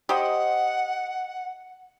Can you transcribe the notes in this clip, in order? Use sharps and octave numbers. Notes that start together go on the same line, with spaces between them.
G4 C5 D#5 F#5